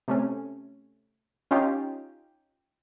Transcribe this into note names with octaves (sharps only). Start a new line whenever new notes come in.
C3 A3 C#4
C#4 D#4 F4 G4